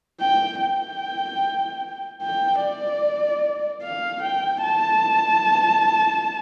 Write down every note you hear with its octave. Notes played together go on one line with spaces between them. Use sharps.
G5
G5
G5
D5
F5
G5
A5